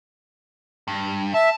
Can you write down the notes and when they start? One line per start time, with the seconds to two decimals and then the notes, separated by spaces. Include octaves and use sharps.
0.88 G2
1.34 E5 A5